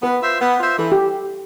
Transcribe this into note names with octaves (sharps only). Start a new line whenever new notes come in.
B3 B4
F4 C5 E5
B3
F4 C5 E5
E3 A4
G4